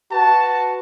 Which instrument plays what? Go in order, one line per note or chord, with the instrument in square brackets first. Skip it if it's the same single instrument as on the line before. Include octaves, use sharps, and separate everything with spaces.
[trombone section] F#4 B4 [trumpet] A5